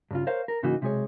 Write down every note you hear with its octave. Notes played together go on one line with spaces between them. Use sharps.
G2 C#3 F4
A#4 C5 C#5 F5
A#4
G#2 C#3 E3 A#3 D#4 F#4
B1 C3 G#3 E4 G#4 C#5